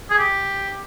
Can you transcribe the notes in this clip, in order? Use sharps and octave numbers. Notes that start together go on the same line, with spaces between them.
G#4
G4